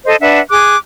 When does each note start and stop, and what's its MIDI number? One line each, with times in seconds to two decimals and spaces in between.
0.05 0.15 69
0.05 0.15 72
0.05 0.15 75
0.20 0.40 62
0.20 0.40 71
0.20 0.40 76
0.20 0.40 78
0.50 0.75 68
0.50 0.75 86
0.50 0.75 90